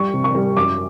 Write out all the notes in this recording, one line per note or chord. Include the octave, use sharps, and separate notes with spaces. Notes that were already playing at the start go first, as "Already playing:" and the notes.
Already playing: G3 C#6
C3
C#6
G3
F#2 D6